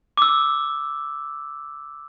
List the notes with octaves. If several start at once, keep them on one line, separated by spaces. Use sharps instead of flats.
D6 E6